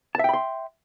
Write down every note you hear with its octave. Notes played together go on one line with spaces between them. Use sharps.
E5 G5 A5 B5 C6